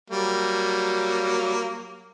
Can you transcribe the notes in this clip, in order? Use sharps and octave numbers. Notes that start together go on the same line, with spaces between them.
F#3 G3 A#3